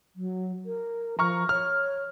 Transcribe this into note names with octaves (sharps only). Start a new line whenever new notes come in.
F#3
A#4
F3 A#5 C#6 F6
C#5 F6